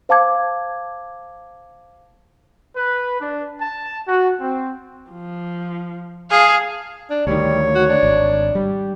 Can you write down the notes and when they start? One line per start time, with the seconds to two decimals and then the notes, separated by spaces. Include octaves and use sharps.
0.09 C5 F5 A5 D6 G#6
2.76 B4
3.19 D4
3.60 A5
4.07 F#4
4.40 C4
5.10 F3
6.31 G#4 F5 A5
7.10 D4
7.27 D2 D#3 G3 C#5
7.75 F#4
7.89 D4
8.03 G#1
8.55 G3